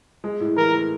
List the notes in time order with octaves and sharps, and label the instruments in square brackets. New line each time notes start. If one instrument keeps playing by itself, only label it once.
[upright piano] G#3
A2
[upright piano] E3 [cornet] A#4
[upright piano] A2